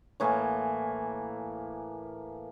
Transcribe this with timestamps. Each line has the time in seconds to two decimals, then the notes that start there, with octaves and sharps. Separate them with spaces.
0.20 A2 E3 A#3 G#5